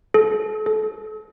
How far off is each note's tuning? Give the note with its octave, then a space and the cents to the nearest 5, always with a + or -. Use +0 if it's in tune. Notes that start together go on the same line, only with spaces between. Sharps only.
A4 -35
A4 -30